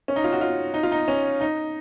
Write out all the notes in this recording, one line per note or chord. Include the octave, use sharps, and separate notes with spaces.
C#4
D#4
F4
F#4
F4
D#4
F4
D#4
C#4
D#4